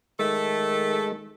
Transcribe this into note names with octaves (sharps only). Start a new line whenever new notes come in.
D#3 G#3 A3 A4